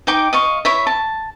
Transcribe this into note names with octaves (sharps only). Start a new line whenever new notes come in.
D#4 G5 D6
D#5 F5 C#6
E4 C#5 E5
A5